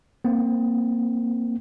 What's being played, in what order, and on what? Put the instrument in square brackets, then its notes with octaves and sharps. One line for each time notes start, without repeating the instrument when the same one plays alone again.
[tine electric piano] A#3 C4